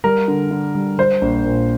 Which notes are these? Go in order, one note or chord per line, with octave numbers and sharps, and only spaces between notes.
G3 A#4
D3
D3
G3
G3 C5
A#1
A#2